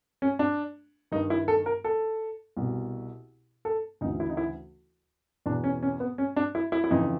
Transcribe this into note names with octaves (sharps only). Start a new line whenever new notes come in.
C#4
D4
G2 D#3 D#4
E4
A4
A#4
A4
C2 B2
A4
D2 C#3 E3 D#4
E4
D#4
E4
E2 B2 D4
C#4
C#4
B3
C#4
D4
E4
E4
E4
F2 C#3 E3 D#4